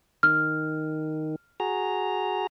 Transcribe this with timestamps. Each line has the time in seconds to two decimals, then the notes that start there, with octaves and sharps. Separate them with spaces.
0.23 D#3 F6
1.60 F#4 G#4 A#5